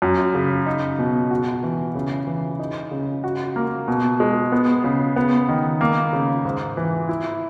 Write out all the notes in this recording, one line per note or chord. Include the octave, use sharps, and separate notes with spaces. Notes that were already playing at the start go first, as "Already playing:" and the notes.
F#2
C#3
D#4
B2
F#4
E3
C#3
E3
D#4
C#3
F#4
A#3
B2
G#3
B3
C#3
B3
D#3
A#3
C#3
G#2
E3
E4